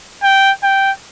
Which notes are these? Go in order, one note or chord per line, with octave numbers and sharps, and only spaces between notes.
G5
G5